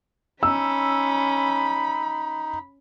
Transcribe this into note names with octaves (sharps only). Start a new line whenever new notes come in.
C#4 D#4 B5 E6